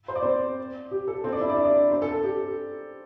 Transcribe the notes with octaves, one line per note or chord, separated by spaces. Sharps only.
C5
D5
C4 C5
G4
A4
C4 C5
D4 D5
E4 E5
D5
E5
D4 D5
C4 C5
A4
A4
G4